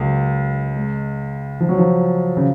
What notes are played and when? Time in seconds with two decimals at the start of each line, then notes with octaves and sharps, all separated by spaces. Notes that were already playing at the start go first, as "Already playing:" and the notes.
Already playing: C#2 F#3 G#3 A#3
0.76 G#3
1.60 F3
1.69 F#3
1.78 F3
2.37 C#3